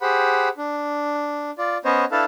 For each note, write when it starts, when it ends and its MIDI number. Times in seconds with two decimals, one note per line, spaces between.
0.01 0.49 67
0.01 0.49 68
0.01 0.49 72
0.01 0.49 78
0.01 0.49 83
0.58 1.51 62
1.58 1.77 65
1.58 1.77 74
1.85 2.05 59
1.85 2.05 61
1.85 2.05 72
1.85 2.05 73
1.85 2.05 75
2.12 2.25 62
2.12 2.25 64
2.12 2.25 69
2.12 2.25 71
2.12 2.25 77
2.12 2.25 81